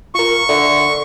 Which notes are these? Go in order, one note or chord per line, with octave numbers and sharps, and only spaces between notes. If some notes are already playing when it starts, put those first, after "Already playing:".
F4 A#4 C#6
D3 D5 E5